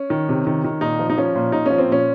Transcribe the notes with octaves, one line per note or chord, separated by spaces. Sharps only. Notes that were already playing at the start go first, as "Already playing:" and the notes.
Already playing: C#4
D#3
C3
D#3
D#3
A#2 D#4
F3
D#4
F3 C#4
A#2
A#2 D#4
F3 C#4
C4
A#2 C#4